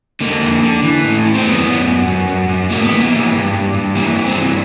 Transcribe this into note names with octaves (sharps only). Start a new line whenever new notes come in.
D3 A#3
F2
D3
E3
A2
E3
C4
F#2 B3
F#2
F#2
F#2
F#2
F#2
A2 A#3
B3
E3
A#3
E3
G2
G2
G2
E3 A#3
G2
C4
E3